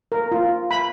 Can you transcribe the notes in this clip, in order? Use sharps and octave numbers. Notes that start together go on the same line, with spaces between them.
A#4
F4
B5